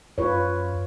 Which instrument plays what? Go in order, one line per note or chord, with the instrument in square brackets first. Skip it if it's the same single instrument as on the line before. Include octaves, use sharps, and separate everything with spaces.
[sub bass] F#2 [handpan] F4 B4 C#5